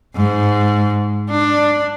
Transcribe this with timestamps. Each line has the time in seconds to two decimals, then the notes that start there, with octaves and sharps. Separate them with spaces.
0.16 G#2
1.31 D4